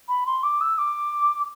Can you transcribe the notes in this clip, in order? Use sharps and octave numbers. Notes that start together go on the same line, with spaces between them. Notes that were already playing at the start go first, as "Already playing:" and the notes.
B5
C6
D6
E6
D6